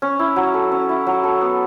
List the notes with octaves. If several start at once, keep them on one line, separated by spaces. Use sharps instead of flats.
C#4
E4
F#3
A4
C#4
E4
F#3
A4
B3